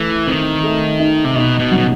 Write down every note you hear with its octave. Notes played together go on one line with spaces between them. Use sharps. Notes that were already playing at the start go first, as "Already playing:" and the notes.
Already playing: E3 A3
D#3 C4
A3
D#4
C3
B2 D#4
B2
F#3
B2